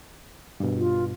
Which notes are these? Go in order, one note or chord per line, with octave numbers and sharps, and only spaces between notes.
G2 B2
F4